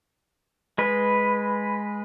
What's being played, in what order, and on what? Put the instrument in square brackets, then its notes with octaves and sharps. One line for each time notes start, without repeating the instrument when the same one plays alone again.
[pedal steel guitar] G#3 B4